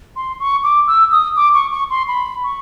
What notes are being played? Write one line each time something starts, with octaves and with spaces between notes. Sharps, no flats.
C6
C#6
D6
E6
D#6
D6
C#6
C#6
C6
B5
C#6